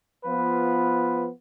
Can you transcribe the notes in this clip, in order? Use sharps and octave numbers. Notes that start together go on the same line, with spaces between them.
F3 B3 F4 B4